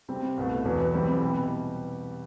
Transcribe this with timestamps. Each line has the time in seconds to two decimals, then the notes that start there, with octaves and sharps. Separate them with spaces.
0.09 C3 G3 C4
0.37 C2 B2 A3
0.65 E2 B2 F#3 B3
0.94 C3 E3 G3 C4 E4
1.22 B2 G3